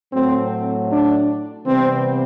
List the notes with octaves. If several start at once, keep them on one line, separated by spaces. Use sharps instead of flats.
A2 F#3 A3 C4
D4
C3 E3 G3 B3 C4